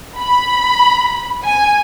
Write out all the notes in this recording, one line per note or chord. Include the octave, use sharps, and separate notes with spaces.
B5
G#5